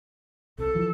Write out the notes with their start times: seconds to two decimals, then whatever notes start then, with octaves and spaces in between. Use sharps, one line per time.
0.58 C2 C3 A4
0.75 E3 F3